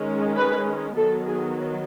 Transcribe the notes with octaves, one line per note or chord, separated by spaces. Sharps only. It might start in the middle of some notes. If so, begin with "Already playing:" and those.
Already playing: D#3 G#3 C#4
B4
D#3 F#3 B3 A4
G#4